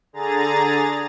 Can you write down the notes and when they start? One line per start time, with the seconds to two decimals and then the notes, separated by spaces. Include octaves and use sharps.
0.13 D3 G#4 A#5 A6